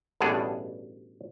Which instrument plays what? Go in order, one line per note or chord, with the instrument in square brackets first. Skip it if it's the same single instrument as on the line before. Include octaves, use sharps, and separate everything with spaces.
[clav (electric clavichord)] A1 G2 B2 D4 G#4 F#5